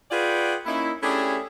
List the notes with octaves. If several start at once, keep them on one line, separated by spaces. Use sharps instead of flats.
F4 G#4 B4 D5 F#5 G5
A#3 C#4 D#4 E4
A3 C#4 D4 E4 G4 G#4